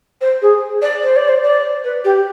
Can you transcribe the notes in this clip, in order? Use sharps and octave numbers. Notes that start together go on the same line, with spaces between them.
C5
G#4
D5
C5
D5
C5
D5
B4
G4